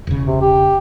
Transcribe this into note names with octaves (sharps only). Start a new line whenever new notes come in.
E1 C#3
C3
G4